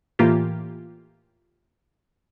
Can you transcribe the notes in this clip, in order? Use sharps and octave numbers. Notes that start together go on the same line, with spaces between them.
A2 E3 A#3 F4 G4